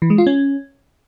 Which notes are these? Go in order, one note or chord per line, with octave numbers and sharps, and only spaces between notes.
E3
G#3
F4
C#4